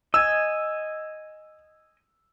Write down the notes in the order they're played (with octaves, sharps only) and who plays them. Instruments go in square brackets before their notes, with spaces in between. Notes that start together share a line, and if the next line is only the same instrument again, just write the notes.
[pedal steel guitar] D#5 G#5 [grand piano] E6